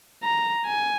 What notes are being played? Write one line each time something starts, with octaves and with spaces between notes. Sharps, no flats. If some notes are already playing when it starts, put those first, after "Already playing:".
A#5
G#5